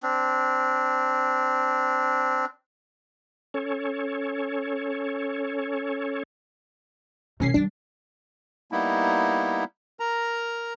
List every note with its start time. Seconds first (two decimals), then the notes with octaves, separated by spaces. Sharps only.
0.03 C4 D4
3.54 C#4 A4 C#5
7.40 C2 C3 E3 C#4 C7
7.54 D#3 G3 D4
8.72 G3 A#3 B3 D#4 E4
10.00 A#4 A#5